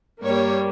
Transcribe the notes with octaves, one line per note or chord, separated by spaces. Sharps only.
G2 G3 A#3 C#5